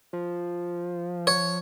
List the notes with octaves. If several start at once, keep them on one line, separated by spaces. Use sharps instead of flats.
F3
C#5